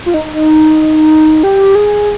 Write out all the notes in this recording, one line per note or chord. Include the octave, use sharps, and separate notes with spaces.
F4
D#4
G4
G#4